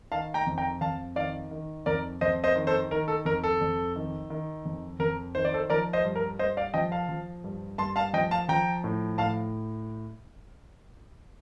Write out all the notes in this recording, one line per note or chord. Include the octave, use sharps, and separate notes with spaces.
D#3 F5 A5
G5 A#5
F2
G5 A#5
F2 F5 A5
D#3 D5 F5
D#3
F2 A#4 D5
F2 C5 D#5
C5 D#5
D#3
A4 C5
D#3 A#4
A4
F2 A#4
A4
F2
D#3
D#3
F2
F2 A#4
D#3 C5
D5
A4 C5
F3 A#4 D5
C5 D#5
G2
A#4
G2 C5 D#5
D5 F5
F3 D#5 G5
F5 A5
F3
G2
G2 A5 C6
F5 A5
F3 D#5 G5
F5 A5
F3 G5 A#5
A2
A2 F5 A5